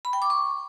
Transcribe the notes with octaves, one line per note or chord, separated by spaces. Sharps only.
B5
G5
D6
C#6